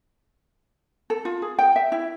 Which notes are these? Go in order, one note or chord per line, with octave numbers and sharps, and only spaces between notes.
A4
F4
G#4
G5
E5
E4